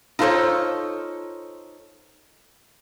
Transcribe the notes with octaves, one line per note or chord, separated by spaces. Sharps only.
D#4 F4 A4 A#4 C5 C#5